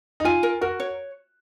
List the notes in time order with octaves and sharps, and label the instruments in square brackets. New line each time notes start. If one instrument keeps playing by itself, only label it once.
[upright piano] D#4
[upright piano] F4 [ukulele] G#5
[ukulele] A#4
[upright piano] F#4 [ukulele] A#4
[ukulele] C#5